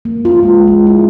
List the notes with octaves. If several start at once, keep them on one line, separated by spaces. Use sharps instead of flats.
A#3
F4
G#3
G#3
E4